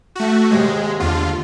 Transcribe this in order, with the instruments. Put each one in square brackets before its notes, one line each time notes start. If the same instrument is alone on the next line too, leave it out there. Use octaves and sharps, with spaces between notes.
[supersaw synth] A3 F#4
[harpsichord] D#2 G#2 C3 [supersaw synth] G#3
[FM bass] E2 [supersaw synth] D3 F4